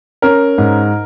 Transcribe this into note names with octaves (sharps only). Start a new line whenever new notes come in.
C#4 A#4
G#2